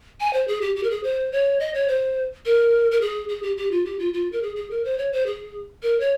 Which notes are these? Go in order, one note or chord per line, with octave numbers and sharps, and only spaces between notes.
G#5
C5
G#4
G4
G4
A#4
G#4
C5
C#5
D#5
C#5
C5
A#4
A#4
G#4
G#4
G4
G4
F4
G4
F4
F4
A#4
G#4
G#4
A#4
C5
C#5
C5
G#4
A#4
C#5